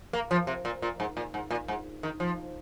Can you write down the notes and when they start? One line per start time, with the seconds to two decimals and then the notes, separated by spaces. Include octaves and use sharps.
0.13 A#3
0.31 F3
0.47 C3
0.65 A#2
0.82 A#2
1.00 G#2
1.17 A#2
1.34 G#2
1.50 A#2
1.68 G#2
2.03 D#3
2.20 F3